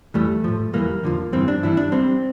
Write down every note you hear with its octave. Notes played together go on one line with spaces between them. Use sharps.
F2 E3 G3 A3
A2 F3
E2 E3 G3 A#3
F2 D3 F3
G2 E3 G3 C4
D4
G2 E3 G3 E4
D4
C2 C3 G3 C4